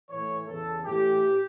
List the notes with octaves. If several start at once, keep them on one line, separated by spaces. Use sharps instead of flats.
A2 E3 C#5
E2 C#3 E3 A4
A2 E3 G4